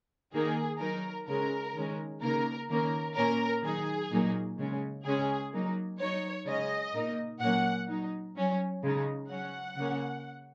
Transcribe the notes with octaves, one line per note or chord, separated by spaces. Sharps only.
D#3 A#3 D#4 G#4
F#3 D#4 A#4
C#3 G#3 C#4 A#4
D#3 G#3 C#4
C#3 A#3 D#4 A#4
D#3 A#3 C#4 A#4
A#2 A#3 C#4 A#4
D#3 F#3 D#4 G#4
A#2 F#3 A#3 D#4
C#3 G#3 C#4
C#3 G#3 C#4 G#4
F#3 A#3 D#4
F#3 D#4 C#5
C#3 G#3 C#4 D#5
A#2 A#3 D#4
A#2 F#3 A#3 C#4 F#5
F#3 D#4
F#3 C#4
C#3 G#3 D#4
F#3 C#4 F#5
C#3 A#3 C#4